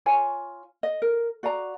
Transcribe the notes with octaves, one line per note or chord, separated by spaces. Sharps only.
F4 C#5 G#5
D#5
A#4
F#4 D5 F5 A#5